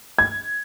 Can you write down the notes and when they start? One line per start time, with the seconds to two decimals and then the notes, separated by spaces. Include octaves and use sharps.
0.18 G#6